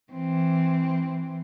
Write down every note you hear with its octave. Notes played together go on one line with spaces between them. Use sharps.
E3 C4